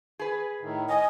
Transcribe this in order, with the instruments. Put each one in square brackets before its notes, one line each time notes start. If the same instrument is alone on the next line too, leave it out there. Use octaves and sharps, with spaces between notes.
[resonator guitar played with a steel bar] G#4 B4
[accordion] A2 D#3
[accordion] D#5 [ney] G#5